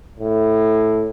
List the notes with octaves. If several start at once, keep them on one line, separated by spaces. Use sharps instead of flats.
A2